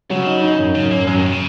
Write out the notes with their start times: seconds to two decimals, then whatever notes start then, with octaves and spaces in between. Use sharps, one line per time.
0.10 C#3 F#3
0.27 D#4
0.42 D#4
0.58 F#2
0.75 F#2 C#3
0.91 F#2 A#3
1.07 F#2 G#3
1.16 D#3
1.26 A#2
1.32 C#3